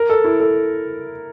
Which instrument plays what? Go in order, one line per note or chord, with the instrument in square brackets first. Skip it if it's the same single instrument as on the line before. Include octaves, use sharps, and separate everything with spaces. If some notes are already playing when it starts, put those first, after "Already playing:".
Already playing: [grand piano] A#4
A4
E4
A4